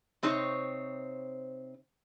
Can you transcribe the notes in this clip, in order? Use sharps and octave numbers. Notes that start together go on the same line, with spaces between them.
C3 C4 D#4 C5 C#5